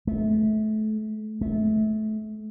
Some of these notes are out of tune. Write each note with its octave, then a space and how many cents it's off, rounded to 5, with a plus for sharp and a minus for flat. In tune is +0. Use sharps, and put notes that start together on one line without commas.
A3 -30
A3 -25